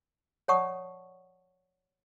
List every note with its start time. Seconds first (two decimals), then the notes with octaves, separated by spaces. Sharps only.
0.48 C#5 D5 F#5 A5 C#6 D#6